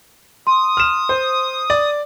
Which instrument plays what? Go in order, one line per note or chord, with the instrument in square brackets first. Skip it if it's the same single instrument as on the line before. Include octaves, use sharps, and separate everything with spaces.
[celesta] C6 [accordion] D#6
[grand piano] F6 E7
C5
D5